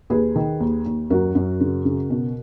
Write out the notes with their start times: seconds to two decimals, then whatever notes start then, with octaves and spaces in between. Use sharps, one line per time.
0.10 D#2 G#4 B4
0.36 D#3
0.60 D#2
0.86 D#2
1.10 F#2 F#4 A#4
1.35 F#2
1.60 C#3
1.85 C#3
2.10 B2